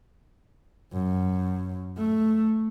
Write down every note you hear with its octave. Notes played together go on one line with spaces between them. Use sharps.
F#2
A3